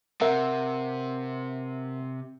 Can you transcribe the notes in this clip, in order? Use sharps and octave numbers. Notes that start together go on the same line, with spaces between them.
C3 A#4 E5 F#5